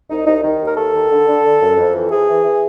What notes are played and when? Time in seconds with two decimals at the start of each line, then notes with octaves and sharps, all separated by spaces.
0.10 C2 D#4
0.26 C2 D#4
0.43 D#3 D#4
0.60 D#2
0.67 A#4
0.77 D#2 A4
0.93 D#3
1.11 D3
1.27 D3
1.44 D3
1.61 F#2
1.76 F2
1.94 E3
2.11 E3 G#4
2.28 E3
2.44 E3